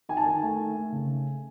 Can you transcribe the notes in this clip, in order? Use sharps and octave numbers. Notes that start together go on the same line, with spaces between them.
D#3 G#5
A5
D#3 G#5
A3
D#3
A3
C#3